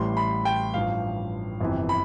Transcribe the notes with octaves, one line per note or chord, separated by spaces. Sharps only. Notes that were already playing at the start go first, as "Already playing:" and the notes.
Already playing: A1 A2 E3 G3 C6
B5
G5
A1 G2 F3 F5
G1 F2 C3 E3
B5